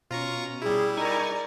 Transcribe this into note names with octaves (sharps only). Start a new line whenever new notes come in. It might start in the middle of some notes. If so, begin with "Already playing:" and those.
B2 C#4 F4 A#5 C#6
G3 E4 G#4
D#4 A#4 D5 G#5 A#5 C#6